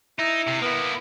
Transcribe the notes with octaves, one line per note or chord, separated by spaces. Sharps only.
D#4 E4
C3
A#3 B3 E4